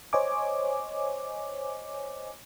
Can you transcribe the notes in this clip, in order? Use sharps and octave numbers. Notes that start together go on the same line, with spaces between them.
C5 C#5 D#5 G#5 D6